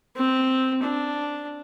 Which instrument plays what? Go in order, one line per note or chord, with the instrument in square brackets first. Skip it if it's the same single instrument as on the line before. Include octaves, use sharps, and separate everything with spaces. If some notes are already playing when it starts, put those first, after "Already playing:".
[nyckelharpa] C4
D4